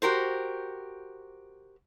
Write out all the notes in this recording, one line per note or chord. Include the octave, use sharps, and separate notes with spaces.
F#4 G4 A#4 C5